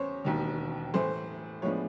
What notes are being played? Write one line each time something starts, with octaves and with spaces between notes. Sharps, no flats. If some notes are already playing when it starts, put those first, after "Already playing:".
Already playing: E2 C#3 B3 C5 C#5
E1 D#2 D#3
A2 E3 A3 C5
A2 F3 G#3 B3 D4 C#5